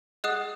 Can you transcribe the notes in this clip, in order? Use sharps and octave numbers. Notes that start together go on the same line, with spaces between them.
G#4 D#5 F#5 D#6 F#6